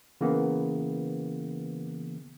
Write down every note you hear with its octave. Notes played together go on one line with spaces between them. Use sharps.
C#3 E3 A#3 B3